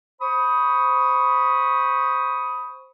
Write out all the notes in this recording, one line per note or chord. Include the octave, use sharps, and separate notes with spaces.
C5 B5 C#6 D#6